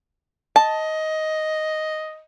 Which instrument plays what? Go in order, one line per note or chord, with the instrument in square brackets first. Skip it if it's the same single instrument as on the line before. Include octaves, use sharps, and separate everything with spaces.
[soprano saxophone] D#5 [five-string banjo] A5